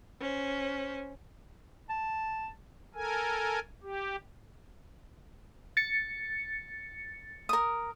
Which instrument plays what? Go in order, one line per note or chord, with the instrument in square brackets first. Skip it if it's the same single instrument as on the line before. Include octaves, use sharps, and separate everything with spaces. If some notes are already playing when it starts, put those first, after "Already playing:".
[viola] C#4 C5
[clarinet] A5
[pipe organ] A4 A#4 G#5
G4
[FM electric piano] A6 C#7
[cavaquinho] A#4 D#6